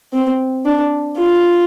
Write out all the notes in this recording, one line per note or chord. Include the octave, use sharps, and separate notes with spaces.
C4
D4
F4